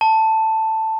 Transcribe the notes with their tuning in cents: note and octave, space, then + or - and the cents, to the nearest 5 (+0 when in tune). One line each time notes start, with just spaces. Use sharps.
A5 +10